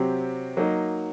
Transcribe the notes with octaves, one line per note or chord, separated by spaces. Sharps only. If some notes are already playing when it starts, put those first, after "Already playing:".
Already playing: C3 F#3 C4 G4
F#3 A#3 D#4